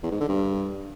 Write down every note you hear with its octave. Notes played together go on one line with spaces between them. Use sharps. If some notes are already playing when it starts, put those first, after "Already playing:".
E2
G#2
D3
G2